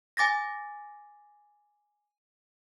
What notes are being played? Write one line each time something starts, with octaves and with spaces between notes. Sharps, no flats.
G#5 D6 A6 A#6